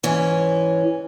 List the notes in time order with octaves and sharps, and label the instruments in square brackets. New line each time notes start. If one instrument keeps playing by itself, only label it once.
[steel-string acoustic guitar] G#2 E3 C#4